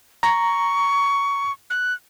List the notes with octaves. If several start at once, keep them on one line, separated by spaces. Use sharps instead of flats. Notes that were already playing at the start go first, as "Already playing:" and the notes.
A#5 C#6
F#6